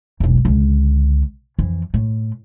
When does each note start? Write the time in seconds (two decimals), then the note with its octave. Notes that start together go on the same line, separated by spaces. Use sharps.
0.20 E1 B1
0.45 C#2 D3
1.59 F2 E3
1.94 A2